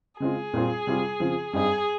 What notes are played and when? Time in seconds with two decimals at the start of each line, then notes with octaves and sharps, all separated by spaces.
0.20 C#3 G#3 C4 F4 G#4
0.54 A#2 G3 C4 F4
0.87 C3 G3 C4 F4
1.20 C#3 F3 C4 F4
1.53 G2 G3 C4 D#4 G#4